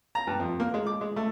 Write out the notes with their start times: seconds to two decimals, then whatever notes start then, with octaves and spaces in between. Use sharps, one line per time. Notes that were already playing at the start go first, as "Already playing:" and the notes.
0.15 A#5
0.27 G2
0.39 F2
0.60 A#3
0.74 G#3
0.87 D6
1.01 G#3
1.16 A3